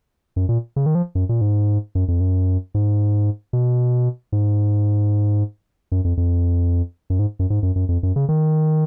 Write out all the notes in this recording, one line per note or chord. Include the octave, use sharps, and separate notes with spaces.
F#2
A#2
C#3
D#3
F3
F#2
A#2
G#2
F#2
F2
F#2
G#2
B2
G#2
F#2
F2
F2
F#2
G#2
F#2
G#2
F#2
F#2
F2
F#2
C#3
D#3